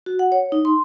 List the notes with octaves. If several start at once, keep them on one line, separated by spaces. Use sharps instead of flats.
F#4
F#5
C#5
D#4
C6